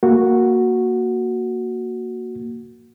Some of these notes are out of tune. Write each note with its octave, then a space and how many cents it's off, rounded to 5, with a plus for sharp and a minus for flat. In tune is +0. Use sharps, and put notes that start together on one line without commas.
A#3 +0 F#4 -5